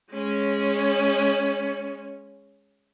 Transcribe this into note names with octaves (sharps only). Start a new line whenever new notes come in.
G#3 C#4